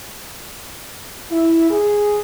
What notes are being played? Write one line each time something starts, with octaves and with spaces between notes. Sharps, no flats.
E4
G#4